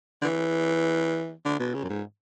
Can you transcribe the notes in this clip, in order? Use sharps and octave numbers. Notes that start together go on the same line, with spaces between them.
D3
E3
D3
B2
C#3
F#2
G#2